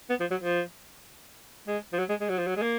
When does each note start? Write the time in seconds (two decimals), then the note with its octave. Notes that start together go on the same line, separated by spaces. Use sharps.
0.10 B3
0.20 F3
0.31 F#3
0.42 F3
1.67 G#3
1.93 F3
1.99 F#3
2.09 G#3
2.20 G#3
2.29 F#3
2.38 F3
2.47 F#3
2.57 G#3
2.62 A#3